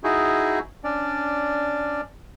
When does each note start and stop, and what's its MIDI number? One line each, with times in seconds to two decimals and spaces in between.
0.04 0.59 63
0.04 0.59 64
0.04 0.59 66
0.04 0.59 68
0.84 2.01 61
0.84 2.01 62
0.84 2.01 74